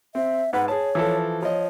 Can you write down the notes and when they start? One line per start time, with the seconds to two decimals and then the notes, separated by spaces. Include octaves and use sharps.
0.15 C4 E5
0.53 G#2 B4 F#5
0.68 G#4 C#5 A5
0.95 E3 F3 A4
1.42 F3 C#5 D#5